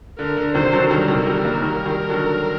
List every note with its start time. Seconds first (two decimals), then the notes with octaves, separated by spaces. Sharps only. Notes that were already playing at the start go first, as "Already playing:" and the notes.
0.19 D3 A#4
0.37 D3
0.54 C3 D#3 C5
0.72 D3 F#3
0.90 D#3 G3 A#4
1.08 C3 D#3
1.26 D#3 G3
1.44 G3 A#3
1.62 D#3 G3
1.86 D#3 G3
2.09 D3 F#3